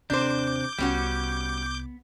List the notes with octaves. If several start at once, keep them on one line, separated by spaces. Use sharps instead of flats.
D#2 C3 C4 D4 C5 D6 G6
C2 G3 B3 C#4 F#4